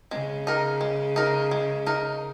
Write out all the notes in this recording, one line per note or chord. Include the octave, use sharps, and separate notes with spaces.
C#3 G#3
D#4 A#4
G#3
D#4 A#4
G#3
D#4 A#4